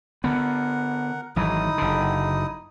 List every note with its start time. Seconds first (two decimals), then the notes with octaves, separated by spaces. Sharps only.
0.24 D3 B3 A#4 F#5
1.36 G#1 E3 F#3 D#4 E4 D#6
1.78 F#1 D3